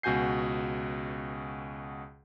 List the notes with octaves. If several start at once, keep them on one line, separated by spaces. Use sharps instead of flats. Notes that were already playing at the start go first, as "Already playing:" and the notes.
C#2 B2 F#4 G#5 G6 C7